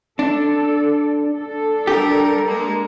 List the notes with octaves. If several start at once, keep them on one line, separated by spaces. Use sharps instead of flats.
D4 A4 D5
D4 A4
G3 G4 A#4
G#3 A#3